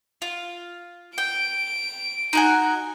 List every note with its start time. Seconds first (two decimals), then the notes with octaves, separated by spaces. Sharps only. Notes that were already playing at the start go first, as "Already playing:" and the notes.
0.22 F4
1.18 G5 D7
2.33 D#4 F#4 G#5